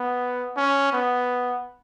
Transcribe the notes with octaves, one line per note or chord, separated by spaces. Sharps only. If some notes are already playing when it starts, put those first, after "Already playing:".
Already playing: B3
C#4
B3